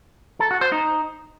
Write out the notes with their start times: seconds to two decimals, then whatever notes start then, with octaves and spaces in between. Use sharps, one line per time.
0.40 A4
0.51 F#4
0.61 C5
0.72 D#4